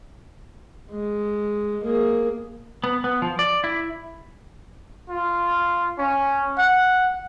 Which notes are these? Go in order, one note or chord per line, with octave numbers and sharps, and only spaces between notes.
G#3
A#3 G#4
B3
B3
F3
D5
E4
F4
C#4
F#5